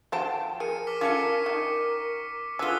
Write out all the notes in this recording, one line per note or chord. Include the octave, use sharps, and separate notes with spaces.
F3 F#4 C5 F5 G5 A5
G#4 A#4 C#7 D#7
D6 F6 B6
C#4 F4 F#4 A4 C#6 D6 C#7
D#3 D#4
D3 F4 G#4 B4 D#6 E6 B6 G7